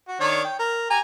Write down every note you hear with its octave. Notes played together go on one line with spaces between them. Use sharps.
F#4
D#3 D4 C#5
G5
A#4
G4 G#5 A#5